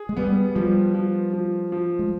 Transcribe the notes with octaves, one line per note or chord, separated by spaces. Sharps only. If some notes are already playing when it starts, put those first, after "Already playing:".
Already playing: G#4
G#3
G3 B3
F3 G3
F3
F3
F3
G#3